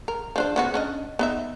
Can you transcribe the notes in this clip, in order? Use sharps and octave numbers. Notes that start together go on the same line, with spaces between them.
A#4
F3 D4 C5
C#3 B3 F#4
C#4 D4 D#5
B3 D#4 E5